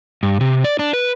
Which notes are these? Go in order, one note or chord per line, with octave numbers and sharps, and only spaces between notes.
G2
C3
D5
D4
B4